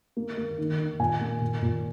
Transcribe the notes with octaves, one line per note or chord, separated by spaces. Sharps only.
A#3
A#3
D#3
D#3
A#2 G#5
A#3
A#2
A#2